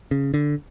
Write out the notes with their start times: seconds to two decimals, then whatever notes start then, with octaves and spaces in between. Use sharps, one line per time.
0.11 C#3
0.34 D3